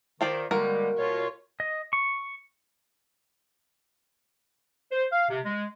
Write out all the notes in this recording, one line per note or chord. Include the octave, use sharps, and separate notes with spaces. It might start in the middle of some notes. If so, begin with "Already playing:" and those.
D#3 F4 C5 D5
D3 G3 G#3 A#3 F#4 A#4
B2 F4 C#5
D#5
C#6
C5
F5
C3
G#3